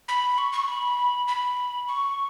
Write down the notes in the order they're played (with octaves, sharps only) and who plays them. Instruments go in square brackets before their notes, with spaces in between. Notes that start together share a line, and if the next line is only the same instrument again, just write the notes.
[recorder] B5
C#6
C#6
B5
B5
C#6